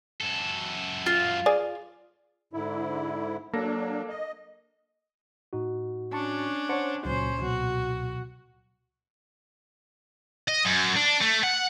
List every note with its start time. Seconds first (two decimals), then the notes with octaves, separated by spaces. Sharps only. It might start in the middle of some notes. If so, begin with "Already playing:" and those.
0.21 F#2 A4
1.06 F4
1.46 G#4 D5
2.53 G#2 D3 E4
3.53 F#3 A#3 D4 A4 A#6
4.09 D#5
5.53 A2 D#4 F#4
6.13 C#4 D4 A5 C#6
6.69 C5 C#5 F#5 A5 C#7
7.05 C#2 A#2 F#3 C#4 C5
7.42 B2 F#3 F#4
10.48 D#5
10.65 F#2
10.97 D4
11.22 A3
11.44 F#5